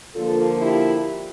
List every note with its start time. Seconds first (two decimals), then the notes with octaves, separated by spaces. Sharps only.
0.15 D3 F3 A#3 F4 A4
0.61 E4 G4